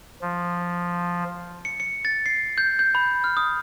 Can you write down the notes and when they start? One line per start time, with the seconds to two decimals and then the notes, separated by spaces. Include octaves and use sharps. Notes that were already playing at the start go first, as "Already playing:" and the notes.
0.22 F3
1.65 C#7
1.80 C#7
2.05 A6
2.26 C7
2.58 G6
2.79 G6
2.95 B5
3.24 F6
3.37 D#6